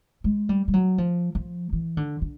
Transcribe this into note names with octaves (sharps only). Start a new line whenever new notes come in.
G#3
G3
G3
F#3
F3
F3
E3
D3
D3